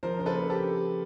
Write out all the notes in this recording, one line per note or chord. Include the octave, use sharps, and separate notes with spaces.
F3 A#4 C5
C#3 C5
A4 B4
A#3
G4 A4